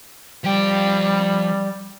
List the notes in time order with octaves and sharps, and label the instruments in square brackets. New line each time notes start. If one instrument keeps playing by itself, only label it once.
[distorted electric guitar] F3 G5 [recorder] G3